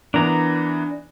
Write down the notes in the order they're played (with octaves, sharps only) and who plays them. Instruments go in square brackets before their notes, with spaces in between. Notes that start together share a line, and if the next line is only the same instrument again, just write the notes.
[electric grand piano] E3 B3 A#4 [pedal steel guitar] D4 A#5